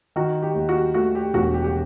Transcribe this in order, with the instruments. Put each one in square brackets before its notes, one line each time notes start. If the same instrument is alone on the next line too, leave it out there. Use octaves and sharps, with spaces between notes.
[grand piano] D#3 [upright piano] F#4
[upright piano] G4
[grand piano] D#2
[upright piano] F#4
[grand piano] A3 [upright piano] F#4
[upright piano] G4
[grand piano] E1 [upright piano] F#4
[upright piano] G4
G4